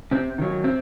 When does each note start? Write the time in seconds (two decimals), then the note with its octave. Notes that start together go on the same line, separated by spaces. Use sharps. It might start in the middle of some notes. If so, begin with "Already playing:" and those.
0.11 C3 C4
0.38 D#3 F#3
0.64 C3 C4